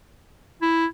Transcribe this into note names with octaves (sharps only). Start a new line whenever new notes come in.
E4